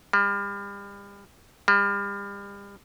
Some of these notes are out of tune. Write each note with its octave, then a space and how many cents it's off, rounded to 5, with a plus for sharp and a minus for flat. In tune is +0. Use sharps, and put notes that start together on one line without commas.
G3 +35
G3 +35